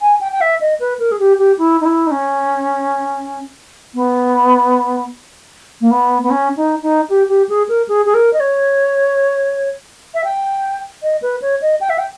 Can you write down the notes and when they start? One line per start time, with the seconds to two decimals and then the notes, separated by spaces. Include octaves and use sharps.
0.01 G#5
0.21 G5
0.32 G5
0.41 E5
0.61 D#5
0.80 B4
0.99 A#4
1.12 G#4
1.19 G4
1.39 G4
1.58 E4
1.81 D#4
1.85 E4
2.07 D#4
2.11 C#4
3.94 B3
5.81 A#3
5.91 B3
6.23 B3
6.30 C#4
6.57 D#4
6.83 D#4
7.10 G4
7.29 G4
7.49 G#4
7.69 A#4
7.88 G#4
8.06 G#4
8.14 A#4
8.33 D#5
8.40 C#5
10.14 E5
10.24 G5
11.03 D#5
11.22 B4
11.42 C#5
11.62 D#5
11.81 G5
11.90 E5
11.98 G5